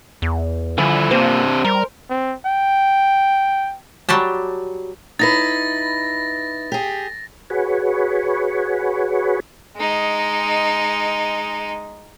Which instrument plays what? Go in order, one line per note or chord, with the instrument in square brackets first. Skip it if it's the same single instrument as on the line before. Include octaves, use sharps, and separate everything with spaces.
[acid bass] E2
[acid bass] D3 [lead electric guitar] F3 E4 [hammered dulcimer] G#5
[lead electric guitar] C3 D4 [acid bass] A#3 [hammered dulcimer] C5
[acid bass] G3 [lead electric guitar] A#4
[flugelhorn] C4
G5
[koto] F#3 G3 G4 A5
[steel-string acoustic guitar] D#4 E4 B4 [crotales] A6 A#6
[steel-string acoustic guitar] G4 G#4
[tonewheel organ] F#4 G#4 B4 C#5
[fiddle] G#3 D#4